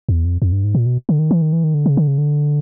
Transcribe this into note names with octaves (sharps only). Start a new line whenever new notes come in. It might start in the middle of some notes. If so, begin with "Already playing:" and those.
E2
F2
F2
G2
G#2
A#2
B2
D3
D#3
E3
D#3
E3
D#3
D3
C#3
D3
C#3
D3